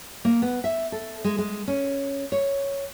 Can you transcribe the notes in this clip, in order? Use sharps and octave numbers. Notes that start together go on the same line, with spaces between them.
A#3
B3
E5
A4
G#3
G#3
C#4
C#5